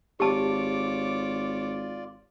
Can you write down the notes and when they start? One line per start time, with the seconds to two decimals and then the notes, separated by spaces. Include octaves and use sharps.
0.20 G#1 F4 G4 C#5 D5 A5 D6